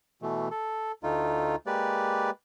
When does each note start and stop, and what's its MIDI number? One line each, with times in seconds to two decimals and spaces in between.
0.22 0.48 47
0.22 0.48 52
0.22 0.48 57
0.51 0.92 69
1.03 1.56 38
1.03 1.56 57
1.03 1.56 63
1.03 1.56 65
1.66 2.30 56
1.66 2.30 58
1.66 2.30 67
1.66 2.30 71
1.66 2.30 74